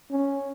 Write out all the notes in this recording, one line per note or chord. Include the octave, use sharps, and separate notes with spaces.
C#4